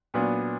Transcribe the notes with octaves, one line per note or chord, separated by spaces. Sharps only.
A#2 F#3 B3 D4